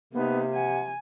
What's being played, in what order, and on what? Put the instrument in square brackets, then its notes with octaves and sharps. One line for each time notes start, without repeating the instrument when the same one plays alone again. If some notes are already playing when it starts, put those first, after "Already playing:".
[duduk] C3 [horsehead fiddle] A#3 D#4 [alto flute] B3
[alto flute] F#5 [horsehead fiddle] G#5